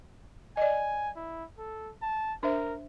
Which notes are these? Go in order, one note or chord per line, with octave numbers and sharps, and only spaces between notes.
D5 D#5 G#5
E4
A4
A5
D4 A#4 C5 E5